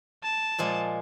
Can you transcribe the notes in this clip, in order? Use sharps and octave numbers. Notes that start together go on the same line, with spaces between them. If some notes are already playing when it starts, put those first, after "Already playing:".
A5
A#2 F3 G#3